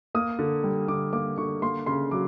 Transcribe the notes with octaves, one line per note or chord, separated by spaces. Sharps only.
A#3 D#6
D3
G3
D3 D6
A#3 D6
D3 C#6
A#3 C6
C#3 C6
F#3 D6